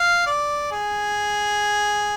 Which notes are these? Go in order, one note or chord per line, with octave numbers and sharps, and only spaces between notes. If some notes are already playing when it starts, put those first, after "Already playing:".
Already playing: F5
D5
G#4